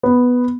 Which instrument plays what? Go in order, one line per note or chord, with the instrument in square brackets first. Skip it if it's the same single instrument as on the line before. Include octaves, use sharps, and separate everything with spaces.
[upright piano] B3